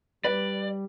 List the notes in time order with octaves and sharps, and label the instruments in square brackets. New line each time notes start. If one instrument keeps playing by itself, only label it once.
[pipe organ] G3 [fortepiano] B4 [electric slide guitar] D5